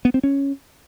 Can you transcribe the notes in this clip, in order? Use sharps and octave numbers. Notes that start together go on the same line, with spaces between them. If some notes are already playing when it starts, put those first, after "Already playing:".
B3
C4
C#4